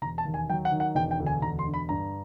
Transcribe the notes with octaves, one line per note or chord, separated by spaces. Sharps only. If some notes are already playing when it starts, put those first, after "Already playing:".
E1 A#5
A5
D#2
G#5
F#3 G5
F#5
D#3
F#5
E1 G5
G5
D2
G#5
E1 A#5
C6
D3
B5
G2 A#5